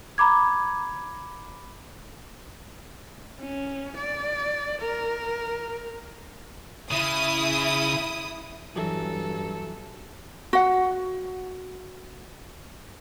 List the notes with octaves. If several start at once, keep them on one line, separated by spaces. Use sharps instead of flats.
A#5 B5 D6 G#6
C#4
D5
A#4
C#3 E4 D#6
G2 E3 F#3 A4
F#4 F#5